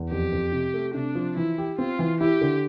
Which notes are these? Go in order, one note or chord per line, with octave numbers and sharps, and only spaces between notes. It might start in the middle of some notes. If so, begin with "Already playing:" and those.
Already playing: E2
F2 G4
F2
C3
A3
C3 D4
F3
E3 E4
G4
C4 F4
E3
E4 G4
D3